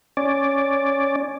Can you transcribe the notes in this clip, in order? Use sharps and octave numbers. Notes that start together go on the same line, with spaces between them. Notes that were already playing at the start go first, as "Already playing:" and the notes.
C#4 D5